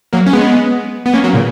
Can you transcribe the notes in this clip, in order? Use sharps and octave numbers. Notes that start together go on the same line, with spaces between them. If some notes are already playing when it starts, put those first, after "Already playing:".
F#3 A#3
C#4
G#3 B3
B3
A#3 C#4
F#3 A#3
A#2 C#3